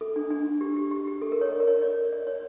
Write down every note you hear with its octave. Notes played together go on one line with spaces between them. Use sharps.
A4
D4
D4
G4
G4
G4
G4
A4
A#4
C#5
D5
A#4
C#5
D5
D5
C#5